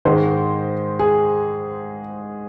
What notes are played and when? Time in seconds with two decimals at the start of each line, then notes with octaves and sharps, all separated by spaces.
0.05 G#2 D#3 G#3 C5
0.99 G#4